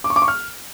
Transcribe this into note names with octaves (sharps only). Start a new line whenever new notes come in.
D6
C#6
D6
C#6
F6